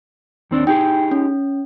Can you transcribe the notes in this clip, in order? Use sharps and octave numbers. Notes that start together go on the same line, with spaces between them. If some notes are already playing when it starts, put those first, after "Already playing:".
D#2 C4 D4
D#4 G4 G#4 G5
C#4